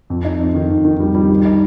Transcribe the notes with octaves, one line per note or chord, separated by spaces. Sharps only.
F2
D#4
F2
D#3
F2
D#3
G3
G3
D#3
D#4